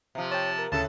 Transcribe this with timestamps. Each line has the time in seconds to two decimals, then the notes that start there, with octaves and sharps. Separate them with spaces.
0.15 C3 F3
0.31 C#5 G5 A5
0.59 A#4
0.72 D2 A2 C#3 A4 A5